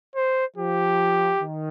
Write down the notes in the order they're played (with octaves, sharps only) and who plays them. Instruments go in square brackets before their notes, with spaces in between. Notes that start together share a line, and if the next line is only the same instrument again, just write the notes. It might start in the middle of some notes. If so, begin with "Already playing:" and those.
[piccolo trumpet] C5
[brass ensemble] F3 [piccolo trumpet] G4
[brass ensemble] D#3